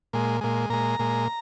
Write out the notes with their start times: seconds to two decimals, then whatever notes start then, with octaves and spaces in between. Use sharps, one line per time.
0.13 A#2 G#3
0.41 A#2 G#3
0.70 A#2 G#3 A#5
0.99 A#2 G#3